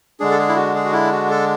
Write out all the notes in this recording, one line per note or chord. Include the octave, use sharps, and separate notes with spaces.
D3 G#3 D4 G#4
A4
G#4
E4
F#4
G#4
F#4
E4
F#4
A4